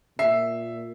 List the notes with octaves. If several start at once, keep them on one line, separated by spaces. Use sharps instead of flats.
A#2 E5 C7